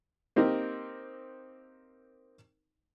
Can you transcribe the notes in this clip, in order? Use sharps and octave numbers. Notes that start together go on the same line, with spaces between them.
A#3 C4 D#4 G4 A#4